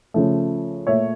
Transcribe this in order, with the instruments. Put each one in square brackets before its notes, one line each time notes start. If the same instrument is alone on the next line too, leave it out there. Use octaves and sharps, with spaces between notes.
[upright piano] C#3 F3 A3
A#2 A3 C#5 E5